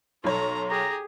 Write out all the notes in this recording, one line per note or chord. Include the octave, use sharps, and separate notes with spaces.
B1 A4 C#5 A#5 C6
G4 G#4 A#5